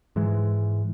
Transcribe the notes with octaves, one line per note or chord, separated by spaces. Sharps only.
G#2 E3 G#3